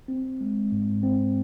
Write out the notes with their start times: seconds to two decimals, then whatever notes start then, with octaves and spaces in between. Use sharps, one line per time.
0.08 C4
0.41 G#3
0.72 G#2
1.03 C4